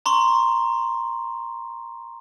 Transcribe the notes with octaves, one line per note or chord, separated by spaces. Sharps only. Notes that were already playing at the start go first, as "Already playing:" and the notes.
A#5 C6 C#6